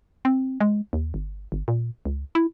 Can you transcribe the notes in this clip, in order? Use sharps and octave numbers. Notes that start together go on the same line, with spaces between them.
C4
G#3
D#2
G1
G1
A#2
C#2
E4